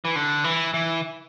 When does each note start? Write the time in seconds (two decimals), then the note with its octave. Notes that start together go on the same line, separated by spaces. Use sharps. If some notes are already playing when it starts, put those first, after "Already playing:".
0.05 E3
0.15 D3
0.44 E3
0.74 E3